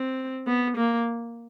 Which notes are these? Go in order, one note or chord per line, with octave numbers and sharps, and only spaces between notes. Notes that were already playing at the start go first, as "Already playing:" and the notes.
Already playing: C4
B3
A#3